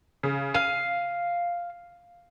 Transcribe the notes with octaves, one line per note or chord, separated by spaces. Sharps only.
C#3
F5 D#7